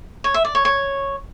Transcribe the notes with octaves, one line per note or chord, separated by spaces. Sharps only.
C#5
E5
D5
C#5
C#5